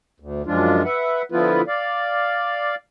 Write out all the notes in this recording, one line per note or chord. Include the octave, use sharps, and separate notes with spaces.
D2
F#2 F3 G#3 D4 F4
B4 E5 F#5
D3 F3 B3 E4 F4 B4
D5 F5